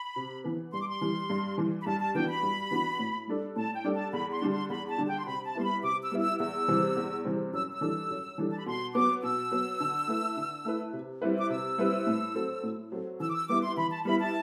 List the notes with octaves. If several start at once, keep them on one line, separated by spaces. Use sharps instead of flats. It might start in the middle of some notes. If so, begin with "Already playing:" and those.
Already playing: B5
C3
E3 B3
G2 C6
D6
C6
E3 G3
G2
E3 G3
B5
G2 A5
A5
E3 B3 D4 F#4 G5
B5
G2
E3 B3 D4 F#4
A2
G3 D4 A4 D5
A2 A5
G5
G3 D4 A4 D5
A5
E2 B5
C6
D3 G3 D4
C6
E2 B5
A5
D3 G3 D4
G5
C6
C3 B5
A5
G3 B3 E4 C6
B5
C3 D6
E6
G3 B3 E4
E6
E2 E6
C3 E3 G3 C4
E2
C3 E3 G3 C4
F#2 E6
E6
E3 G3 D4 A4
F#2
E3 G3 D4 A4
A5
B5
B2 C6
F#3 B3 D6
B2 E6
F#3 B3
D3
A3 E4 B4
D3
A3 E4 B4
C3
G3 C4 E4 B4
D6
C3 E6
G3 C4 E4 B4
A2
F#3 C4 F#4 A4
A2
F#3 C4 F#4 A4
E3 E6
D6
E6
G3 B3 E4 D6
C6
E3 B5
A5
G3 B3 E4 B5
A5